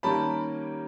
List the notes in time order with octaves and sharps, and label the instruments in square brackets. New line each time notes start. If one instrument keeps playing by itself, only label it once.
[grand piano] D#3 G3 A#3 C#4 A5 B5